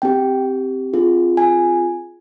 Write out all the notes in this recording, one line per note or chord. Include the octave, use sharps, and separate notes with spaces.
C4 G4 G5
C4 F4 G#4
G#5